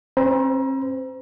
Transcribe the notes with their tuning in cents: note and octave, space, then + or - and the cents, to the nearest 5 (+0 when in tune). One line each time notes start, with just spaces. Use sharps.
C4 +40 C5 -30 A#5 +35